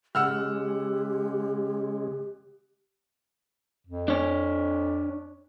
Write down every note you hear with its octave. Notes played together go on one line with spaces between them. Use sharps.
C#3 G#3 G4 F#5 E6 F6
F2
D4 C#5